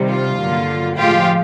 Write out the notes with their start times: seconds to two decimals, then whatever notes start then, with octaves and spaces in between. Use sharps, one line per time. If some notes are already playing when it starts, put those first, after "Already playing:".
Already playing: C3 D#3 G3
0.09 F4
0.39 G2 D3 F#3 A#3
0.98 A2 F3 G#3 F4 G4